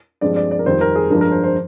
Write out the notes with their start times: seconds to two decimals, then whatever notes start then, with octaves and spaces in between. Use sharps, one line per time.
0.21 G2 F3 G#3 C4 D5
0.36 D5
0.51 D5
0.59 A#4
0.66 F2 D#3 G3 C4 C5
0.81 A#4
0.96 G#4
1.10 G2 F3 G#3 D4 A#4
1.21 A#4
1.32 C5
1.44 C5